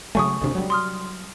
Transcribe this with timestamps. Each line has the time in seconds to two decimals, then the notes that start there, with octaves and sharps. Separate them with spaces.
0.15 C#3 F#3 A3 G#5 C#6 D#6
0.42 D2 C3 D4
0.55 F#3 G3
0.70 C6 D#6 F6